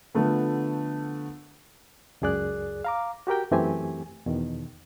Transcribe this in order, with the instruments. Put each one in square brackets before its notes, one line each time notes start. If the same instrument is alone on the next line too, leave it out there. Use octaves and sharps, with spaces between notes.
[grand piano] D3 F3 A3 B3
[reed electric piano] C#2 F#2 G#4 D5 F#6
F5 A#5 D6
F#4 G4 A#4 G5
F#2 E3 A3 C4 G4 G#5
E2 B2 D#3